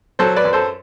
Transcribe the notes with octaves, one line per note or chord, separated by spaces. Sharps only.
F#3 A4 C5
B4 D5
F#2
A4 C5